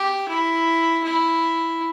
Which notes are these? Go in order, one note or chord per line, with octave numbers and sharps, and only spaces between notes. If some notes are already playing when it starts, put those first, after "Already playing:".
Already playing: G4
E4
E4